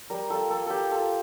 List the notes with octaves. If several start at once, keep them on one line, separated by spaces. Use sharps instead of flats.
G3 A#4
F4 A4
A#3 A4
A#3 G4 A4
F4 A4